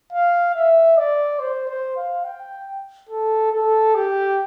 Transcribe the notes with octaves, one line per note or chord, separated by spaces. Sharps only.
F5
E5
D5
C5
C5
F5
G5
A4
A4
G4